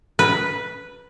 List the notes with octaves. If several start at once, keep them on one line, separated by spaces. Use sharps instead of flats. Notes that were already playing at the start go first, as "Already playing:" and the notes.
B4